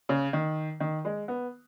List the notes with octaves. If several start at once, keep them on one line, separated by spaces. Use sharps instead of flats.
C#3
D#3
D#3
G#3
B3